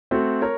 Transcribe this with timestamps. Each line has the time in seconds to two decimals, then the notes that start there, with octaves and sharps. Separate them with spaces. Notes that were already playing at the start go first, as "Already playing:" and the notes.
0.11 A3 C4 F#4
0.42 A#4 C#5